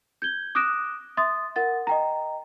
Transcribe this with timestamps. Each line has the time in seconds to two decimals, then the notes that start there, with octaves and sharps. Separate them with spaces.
0.22 G6 G#6 G7
0.55 D6 D#6 F#6 A#6 D7 E7
1.17 E5 C6 D#6 A6
1.56 A#4 F#5 A6
1.87 D#5 G5 A#5